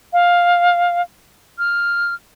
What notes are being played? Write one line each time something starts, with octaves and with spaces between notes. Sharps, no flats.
F5
F6